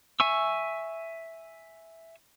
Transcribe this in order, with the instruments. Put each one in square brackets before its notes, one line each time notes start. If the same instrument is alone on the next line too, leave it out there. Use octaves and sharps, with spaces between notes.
[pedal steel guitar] E5 G#5 C#6 E6